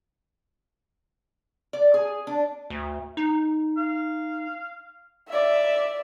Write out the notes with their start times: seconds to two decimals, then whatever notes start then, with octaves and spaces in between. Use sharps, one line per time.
1.73 D5
1.94 G#4
2.27 D4
2.70 D2
3.17 D#4
3.77 F5
5.29 D5 E5